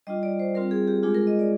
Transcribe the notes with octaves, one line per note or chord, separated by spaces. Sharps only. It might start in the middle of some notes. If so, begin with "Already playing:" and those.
G3 D4 F4 D#5
D5
C5
G3 C4 F4 A#4
G#4
G4
G#3 D4 F4 G#4
A#4
D#5
D5